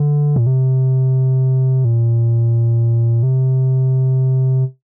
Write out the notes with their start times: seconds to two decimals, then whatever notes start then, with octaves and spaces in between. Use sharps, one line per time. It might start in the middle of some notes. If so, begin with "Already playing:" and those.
Already playing: D3
0.36 A#2
0.47 C3
1.85 A#2
3.23 C3